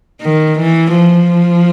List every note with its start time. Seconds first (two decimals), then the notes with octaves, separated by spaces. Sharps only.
0.22 D#3
0.59 E3
0.96 F3